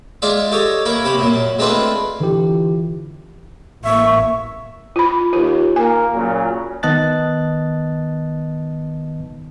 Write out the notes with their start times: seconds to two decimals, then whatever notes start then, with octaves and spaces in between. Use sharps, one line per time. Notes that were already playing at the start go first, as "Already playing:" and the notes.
0.22 G#3 F4 D5 E5
0.52 G4 A4 C#5 D#5
0.85 A#3 E4 A#4 C#5
1.05 C3 G4 B5
1.18 F#2 A#2 F#3
1.59 G#3 A3 C4 D4 F4 B4
2.20 D3 E3 E4 F4 G4
3.85 A1 A#3 E5 C#6
4.96 F4 B5
5.33 D#2 F4
5.76 A#3 G#5
6.14 A#2 C#3 F#3
6.83 D#3 B3 D#5 A5 F#6 A6